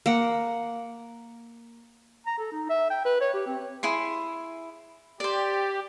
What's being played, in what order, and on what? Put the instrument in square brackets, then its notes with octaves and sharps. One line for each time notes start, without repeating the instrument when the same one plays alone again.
[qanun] A#3 F#5
[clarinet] A#5
A4
D#4
E5
G5
B4
C#5
G4
C4
[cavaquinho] E4 G#4 C6
[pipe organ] G4 [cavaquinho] C5 D5